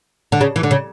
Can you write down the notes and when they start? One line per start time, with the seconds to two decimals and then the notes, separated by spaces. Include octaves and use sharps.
0.32 D3
0.41 C#3
0.56 E3
0.63 D3
0.71 C#3